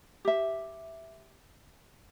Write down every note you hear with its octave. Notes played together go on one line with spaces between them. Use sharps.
G4 E5